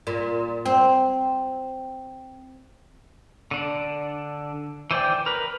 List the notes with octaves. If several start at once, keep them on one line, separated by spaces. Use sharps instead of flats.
A#2
C4
D3 D4
E3 C5 D5 G5
A#4 B4